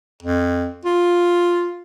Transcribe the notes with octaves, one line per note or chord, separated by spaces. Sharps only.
F2
F4